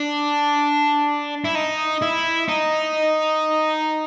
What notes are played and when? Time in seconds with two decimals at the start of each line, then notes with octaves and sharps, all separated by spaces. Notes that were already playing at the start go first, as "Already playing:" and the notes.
Already playing: D4
1.45 E4
1.55 D#4
2.02 E4
2.48 D#4